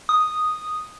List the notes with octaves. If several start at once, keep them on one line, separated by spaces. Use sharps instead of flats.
D#6